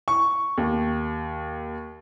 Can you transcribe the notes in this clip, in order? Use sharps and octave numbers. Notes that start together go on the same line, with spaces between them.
C#6
D#2